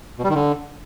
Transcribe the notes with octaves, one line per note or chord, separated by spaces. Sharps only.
B2
G3
D#3
D3